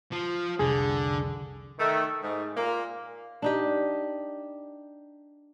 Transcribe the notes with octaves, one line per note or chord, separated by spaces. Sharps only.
F3
F1 C2 D3 G#4
D#3 A3
G#2
A#2 A#3
D4 D#4 G4